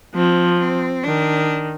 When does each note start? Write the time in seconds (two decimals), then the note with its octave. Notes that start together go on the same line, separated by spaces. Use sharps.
0.15 F3 C4
0.60 C4
1.04 D#3 D4